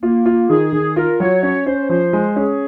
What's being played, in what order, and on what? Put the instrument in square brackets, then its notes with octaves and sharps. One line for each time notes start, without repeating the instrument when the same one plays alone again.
[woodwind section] A#3 [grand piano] F4
[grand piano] F4
[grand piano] D#3 [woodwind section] G#4
[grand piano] D#3
[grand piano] F4 [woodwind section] A#4
[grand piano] F#3 [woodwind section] C#5
[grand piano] C#4 [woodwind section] C#5
[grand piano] C#4 [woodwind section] C5
[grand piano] F3 [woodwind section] C5
[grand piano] G#3
[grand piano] C#4 [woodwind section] G#4